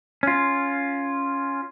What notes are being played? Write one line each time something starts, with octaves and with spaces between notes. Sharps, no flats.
C#4 F4